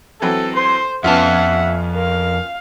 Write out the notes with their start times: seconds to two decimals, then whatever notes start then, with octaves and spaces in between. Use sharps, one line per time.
0.22 E3 F#3 C4 A4
0.56 C5 C6
1.04 F2 B3 C#4 F4 E5 F#5 A5
1.95 A#4 F5